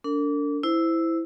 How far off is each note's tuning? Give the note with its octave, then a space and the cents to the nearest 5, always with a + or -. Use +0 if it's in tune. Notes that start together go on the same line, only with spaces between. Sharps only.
D4 -30 A#4 -45
E4 +0 C5 -15